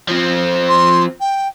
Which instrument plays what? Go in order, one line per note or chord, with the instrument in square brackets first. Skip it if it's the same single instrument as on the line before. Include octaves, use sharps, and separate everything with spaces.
[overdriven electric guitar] F3 C4
[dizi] C6
G5